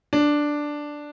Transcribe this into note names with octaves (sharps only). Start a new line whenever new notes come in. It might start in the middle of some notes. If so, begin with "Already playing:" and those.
D4